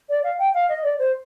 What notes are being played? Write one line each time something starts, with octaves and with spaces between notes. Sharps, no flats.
D5
F5
G5
F5
D#5
D5
C5